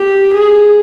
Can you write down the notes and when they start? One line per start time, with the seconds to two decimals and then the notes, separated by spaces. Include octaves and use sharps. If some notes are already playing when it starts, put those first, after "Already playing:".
Already playing: G4
0.33 G#4